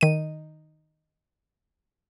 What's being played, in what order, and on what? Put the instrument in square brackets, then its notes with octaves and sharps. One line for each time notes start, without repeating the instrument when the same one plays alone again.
[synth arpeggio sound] D#3 D#7